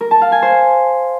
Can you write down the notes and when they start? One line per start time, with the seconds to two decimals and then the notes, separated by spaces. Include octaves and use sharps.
0.01 A#4
0.11 A5
0.21 F5
0.32 G#5
0.42 C5